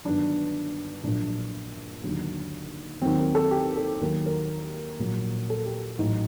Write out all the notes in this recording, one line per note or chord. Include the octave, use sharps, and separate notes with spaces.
G1 G2 D#3 F#3 D4
A#1 A#2 F#3 D4
D#2 D3 F#3
D#2 D#3 F#3 C4
A#4
A4
G4
A4
D#2 D#3 F#3 A#4
A#4
A#1 A#2 F#3
A4
G4
A1 A2 F#3 D#4